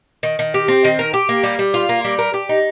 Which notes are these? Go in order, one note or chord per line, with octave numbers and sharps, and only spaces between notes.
D#3
D#3
G4
C4
D#3
A#4
G4
A#3
G3
G3
F4
A#3
G3
A#4
G4
D#4